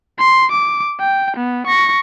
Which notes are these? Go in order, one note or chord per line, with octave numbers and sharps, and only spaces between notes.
C6
D6
G5
B3
C#6 A#6